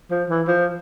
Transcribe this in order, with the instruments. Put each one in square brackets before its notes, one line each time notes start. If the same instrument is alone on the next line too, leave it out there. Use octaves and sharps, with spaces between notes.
[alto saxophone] F3
E3
F3